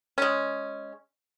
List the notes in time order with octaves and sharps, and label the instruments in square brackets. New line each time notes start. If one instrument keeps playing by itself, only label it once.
[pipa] G#3 C#4